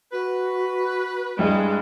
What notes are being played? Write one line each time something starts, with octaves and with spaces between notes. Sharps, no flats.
F#4 B4
G2 G3 G#3 E4